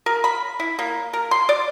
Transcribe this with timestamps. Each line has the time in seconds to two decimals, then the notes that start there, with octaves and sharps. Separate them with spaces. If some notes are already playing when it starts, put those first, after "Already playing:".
0.06 A#4
0.24 B5
0.60 E4
0.79 A#3
1.13 A#4
1.31 C6
1.49 D5